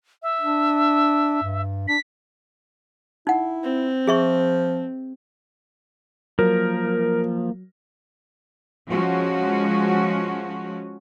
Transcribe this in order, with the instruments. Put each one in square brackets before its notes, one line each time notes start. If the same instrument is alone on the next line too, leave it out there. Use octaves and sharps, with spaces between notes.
[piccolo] E5
[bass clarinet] D4
G2
[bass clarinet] D4 [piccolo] B6
[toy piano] D#4 F#5 [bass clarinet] E4
[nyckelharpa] C4
[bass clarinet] F3 [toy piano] G#4 E5 C#6
[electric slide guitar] F3 [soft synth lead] F#3 [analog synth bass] A#3 [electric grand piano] A#4
[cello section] F3 G#3 C#4 F#4